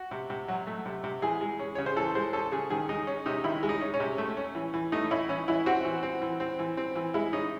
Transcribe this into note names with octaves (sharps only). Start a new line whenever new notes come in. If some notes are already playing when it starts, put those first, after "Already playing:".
Already playing: F#4
C3
C3
F#3
A3
C3
C3
E3 G#4
G#3
C#4
C#3 C#5
C5
E3 A4
G#3 C5
C#4 A4
C#3 G#4
D#3 G#4
G#3 D#4
C#4
C3 D#4
D#3 E4
G#3
D#4
C#4
C#4
C3
A3
C#4
E3
E3
A3 D#4
C#4 E4
E3 C#4
E3 E4
C4 F#4
E3
C4
E3
C4
E3
C4
E3
G#3 E4
C#4 D#4